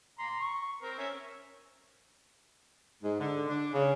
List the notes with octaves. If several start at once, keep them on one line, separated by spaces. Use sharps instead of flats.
A#5 C6
C#6
C4 A#4
C#4 E5
G#2
D3
D4
C#3